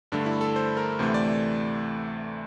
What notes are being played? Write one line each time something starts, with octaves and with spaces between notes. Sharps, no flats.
G2 D3 A3 D4
E4
A4
C5
A#4
D2 C3 E3 A3 C5
D5